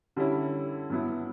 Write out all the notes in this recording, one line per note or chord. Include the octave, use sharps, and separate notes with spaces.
D3 G3 C#4 E4
G2 F#3 B3 E4